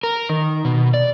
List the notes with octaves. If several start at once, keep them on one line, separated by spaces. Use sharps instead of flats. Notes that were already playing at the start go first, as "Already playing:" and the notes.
A#4
D#3
B2
D5